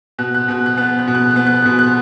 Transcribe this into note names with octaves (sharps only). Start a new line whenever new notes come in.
B2 F#6
F#6
B2 F#6
F#6
B3
F#6
F#6
B2
F#6
F#6
B3
F#6
B2 F#6
F#6